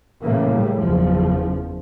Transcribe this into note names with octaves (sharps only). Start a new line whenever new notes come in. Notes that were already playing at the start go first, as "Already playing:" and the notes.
A2 C#3 E3 A#3
A2 G3
F#1 E2 F3